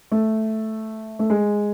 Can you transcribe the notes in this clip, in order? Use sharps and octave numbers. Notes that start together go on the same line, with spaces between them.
A3
A3
G#3